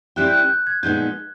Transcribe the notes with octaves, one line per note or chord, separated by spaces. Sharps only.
G3 C4 E4 G4 F#6
G6
F#6
G6
G#6
A#2 F3 G#3 B3 D#4 G6